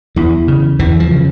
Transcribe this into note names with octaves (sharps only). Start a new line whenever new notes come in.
E2 E3
C#3
E2 E3
F3
C#3